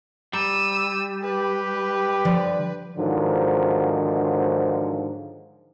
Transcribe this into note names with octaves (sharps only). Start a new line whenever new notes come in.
G3 A#5 E6 D#7
G4 B4
D3 F3 D5
G#2 D3 D#3 F3 F#3